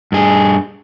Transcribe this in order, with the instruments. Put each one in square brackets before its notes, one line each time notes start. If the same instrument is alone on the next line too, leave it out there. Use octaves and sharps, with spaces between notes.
[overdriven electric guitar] G2 G#4